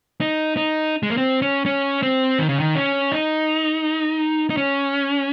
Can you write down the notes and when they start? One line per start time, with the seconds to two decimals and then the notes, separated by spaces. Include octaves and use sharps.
0.21 D#4
0.57 D#4
1.03 G#3
1.10 A#3
1.17 C4
1.42 C#4
1.66 C#4
2.03 C4
2.39 D#3
2.49 C#3
2.60 D#3
2.75 C#4
3.12 D#4
4.50 D#4
4.57 C#4